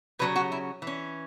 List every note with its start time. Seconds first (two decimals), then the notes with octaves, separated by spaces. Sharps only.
0.19 C#3 F#3 C#4 B4
0.36 F#4
0.52 E4
0.82 E3 C#4